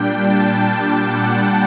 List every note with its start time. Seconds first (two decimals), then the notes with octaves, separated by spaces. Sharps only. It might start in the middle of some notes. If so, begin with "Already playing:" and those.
Already playing: A#2 G3 D4 G5
0.17 A5
1.00 F#5